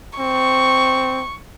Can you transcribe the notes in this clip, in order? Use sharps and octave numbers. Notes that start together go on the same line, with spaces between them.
C4 C#6